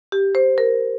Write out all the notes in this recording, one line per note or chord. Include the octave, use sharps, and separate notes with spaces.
G4
C5
A#4